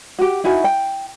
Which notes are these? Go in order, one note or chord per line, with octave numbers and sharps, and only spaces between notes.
F#4 G4
D#4 E4 F#4 G#5
G5